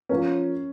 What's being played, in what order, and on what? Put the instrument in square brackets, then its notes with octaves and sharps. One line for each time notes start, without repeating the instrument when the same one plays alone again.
[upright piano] F3 A#3 F4 A#4 C#5 [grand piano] C#4